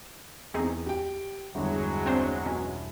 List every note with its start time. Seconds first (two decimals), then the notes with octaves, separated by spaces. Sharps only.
0.54 E2 C4 D#4 G#4
0.86 G4 G5
1.55 G1 E2 F#3 G#3
2.06 C4 D4 C5
2.45 B2 C#4